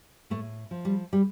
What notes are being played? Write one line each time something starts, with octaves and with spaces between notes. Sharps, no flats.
A2 A3
F3
G3
G3